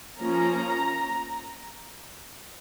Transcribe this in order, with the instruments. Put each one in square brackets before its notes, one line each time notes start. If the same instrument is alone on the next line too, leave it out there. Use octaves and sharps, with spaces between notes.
[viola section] F3 A#3 C#4 A#5